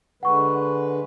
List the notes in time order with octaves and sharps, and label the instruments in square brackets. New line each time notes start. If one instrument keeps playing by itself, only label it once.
[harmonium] D3 G#3 B4 [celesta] F#5 C#6